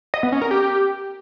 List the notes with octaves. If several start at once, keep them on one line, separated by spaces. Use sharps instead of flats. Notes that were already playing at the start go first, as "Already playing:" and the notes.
D#5
B3
C#4
A#4
G4